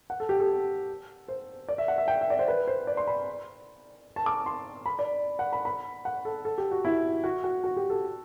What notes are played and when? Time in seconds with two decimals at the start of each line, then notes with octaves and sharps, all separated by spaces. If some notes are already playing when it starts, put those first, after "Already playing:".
0.10 F#5
0.20 A4
0.29 G4
0.40 A4
1.28 C5
1.68 D5
1.78 E5
1.88 F#5
1.98 E5
2.08 G5
2.21 E5
2.30 D5
2.39 C5
2.48 B4
2.68 C5
2.87 D5
2.97 C6
3.07 B5
4.16 A5
4.26 D6
4.46 C6
4.86 B5
4.99 D5
5.39 F#5
5.53 B5
5.65 B5
6.05 F#5
6.25 A4
6.45 A4
6.58 G4
6.71 F#4
6.85 E4
7.24 F#4
7.44 F#4
7.64 F#4
7.77 G4
7.90 A4